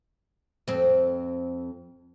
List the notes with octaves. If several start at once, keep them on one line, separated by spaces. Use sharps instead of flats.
F2 C4